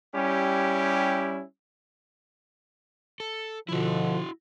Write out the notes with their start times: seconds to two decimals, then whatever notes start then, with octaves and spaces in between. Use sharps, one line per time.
0.15 G3 C#4 E4 G4
3.20 A4
3.69 B2 D3 F3 E4 F#4